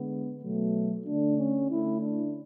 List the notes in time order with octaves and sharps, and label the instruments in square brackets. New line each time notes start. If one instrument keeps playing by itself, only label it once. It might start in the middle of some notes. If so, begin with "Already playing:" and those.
Already playing: [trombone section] D3 G#3 B3
B2 F#3 A3
D3 A3 D4
C#4
D3 A3 E4
D4